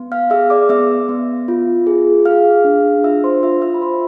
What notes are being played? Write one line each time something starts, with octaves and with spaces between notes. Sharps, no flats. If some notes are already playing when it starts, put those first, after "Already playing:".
Already playing: B3
F5 F6
G#4 E5 E6
D5 D6
B3 E5 E6
B3
F4
G#4
G#4 F5 F6
D4
F4 E5 E6
C5 C6
F4 E5 E6
E5 E6
B5
F4 C5 C6